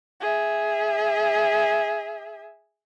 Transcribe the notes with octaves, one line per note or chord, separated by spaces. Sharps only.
G#4 E5